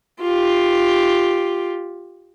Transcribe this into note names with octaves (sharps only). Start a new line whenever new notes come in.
F4 G4